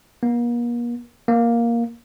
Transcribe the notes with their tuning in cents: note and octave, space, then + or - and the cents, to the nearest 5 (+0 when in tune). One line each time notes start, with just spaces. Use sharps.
A#3 +40
A#3 +5